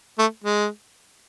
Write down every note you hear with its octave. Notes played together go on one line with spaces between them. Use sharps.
A3
G#3